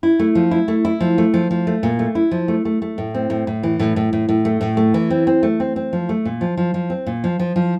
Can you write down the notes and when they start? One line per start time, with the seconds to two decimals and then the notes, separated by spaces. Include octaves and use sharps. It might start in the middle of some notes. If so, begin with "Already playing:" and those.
0.03 E4
0.19 A3
0.35 F3
0.51 E4
0.68 A3
0.85 E4
1.00 F3
1.18 A3
1.34 F3
1.51 F3
1.67 A3
1.83 A#2
1.99 A3
2.15 E4
2.31 F3
2.48 A3
2.65 A3
2.82 A3
2.98 A2
3.14 C4
3.30 A2
3.47 A2
3.63 E3
3.79 A2
3.96 A2
4.13 A2
4.29 A2
4.45 A3
4.61 A2
4.77 A3
4.94 E3
5.10 C4
5.27 C4
5.43 A3
5.60 C4
5.76 C4
5.93 F3
6.09 A3
6.25 A#2
6.41 F3
6.57 F3
6.74 F3
6.90 C4
7.07 A#2
7.24 F3
7.39 F3
7.56 F3